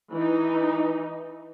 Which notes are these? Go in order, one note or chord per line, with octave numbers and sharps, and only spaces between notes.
E3 D#4